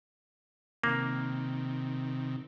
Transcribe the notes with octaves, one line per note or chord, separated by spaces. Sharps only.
C3 D#3 A#3